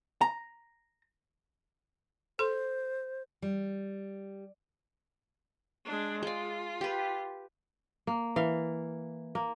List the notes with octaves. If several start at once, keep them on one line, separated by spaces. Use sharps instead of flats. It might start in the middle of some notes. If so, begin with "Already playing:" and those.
A#5
A4 C5 C6
G3
G#3 D4
G#3 F4 D5
G4 B4
A#3
E3 F5
A#3